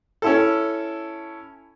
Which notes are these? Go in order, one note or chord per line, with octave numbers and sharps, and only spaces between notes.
C#4 E4 A4